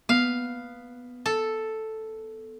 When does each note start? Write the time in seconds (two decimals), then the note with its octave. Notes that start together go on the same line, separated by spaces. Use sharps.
0.09 B3 F5
1.26 A4